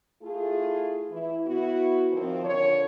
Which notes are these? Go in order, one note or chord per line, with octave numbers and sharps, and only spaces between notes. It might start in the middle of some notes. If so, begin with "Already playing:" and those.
A3 E4 F4 G#4
E3 E4
B3 E4 F#4
D#3 F3 C4
D3 F4 A#4 C#5